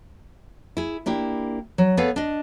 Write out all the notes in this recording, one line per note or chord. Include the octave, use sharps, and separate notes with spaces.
E4 G#4
A#3 D4 E4 G4
F#3
B3 G#4 A4 B4 C#5 F5
D4 D#5